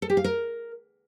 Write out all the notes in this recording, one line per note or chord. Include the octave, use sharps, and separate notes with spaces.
A4
G4
F5
A#4